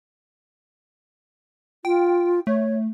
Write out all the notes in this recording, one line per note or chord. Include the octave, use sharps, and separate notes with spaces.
F4 G5
A3 C#5